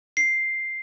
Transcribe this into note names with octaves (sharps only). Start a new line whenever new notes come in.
C7